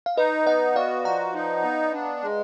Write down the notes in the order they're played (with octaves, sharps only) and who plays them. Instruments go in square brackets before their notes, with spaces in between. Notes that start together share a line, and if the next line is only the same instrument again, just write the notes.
[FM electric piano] F5
[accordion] D#4 [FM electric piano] B4 D#5
[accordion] B3 [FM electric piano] D#5 F#5
[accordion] F#4 [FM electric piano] D5 F5
[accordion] F3 [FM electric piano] F#5 A#5
[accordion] D#4
B3
D4
G#3